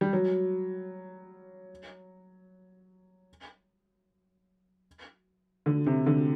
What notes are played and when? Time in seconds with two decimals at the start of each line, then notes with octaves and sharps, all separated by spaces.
0.01 G3
0.13 F#3
5.66 D3
5.87 C3
6.06 D3